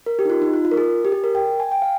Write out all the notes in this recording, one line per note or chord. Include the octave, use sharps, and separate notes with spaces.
A#4
G4
D#4
F4
D#4
F4
F4
A#4
G#4
G4
G#4
A#4
G5
G#5
G5
F5